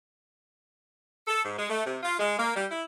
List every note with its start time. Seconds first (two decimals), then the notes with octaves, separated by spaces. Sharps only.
1.27 A4
1.44 G#2
1.57 G#3
1.70 A3
1.86 C3
2.03 F4
2.19 G#3
2.37 A#3
2.55 G3
2.70 E4